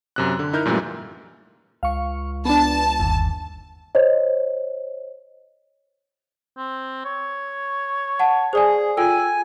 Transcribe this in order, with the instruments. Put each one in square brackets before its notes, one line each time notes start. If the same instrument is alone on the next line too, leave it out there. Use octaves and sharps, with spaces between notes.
[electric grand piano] F#2 C3 F#6
D3
D#4 E4 A#4 F6 G6
F#2 A#2 E3 G3 A3
[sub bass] C#2 [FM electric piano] F5 C#6
[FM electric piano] B3 D4 [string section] A5
[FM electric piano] G1 D#2
[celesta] C5 C#5 D#5
[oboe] C4
C#5
[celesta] F#5 A5
[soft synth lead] G#4 [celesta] C5 D5 G#5
[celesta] F4 A4 G5 [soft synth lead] G#5 [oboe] E6